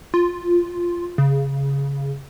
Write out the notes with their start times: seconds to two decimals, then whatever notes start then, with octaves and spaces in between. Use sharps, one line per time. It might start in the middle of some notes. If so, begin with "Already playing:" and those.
0.14 F4
1.18 C#3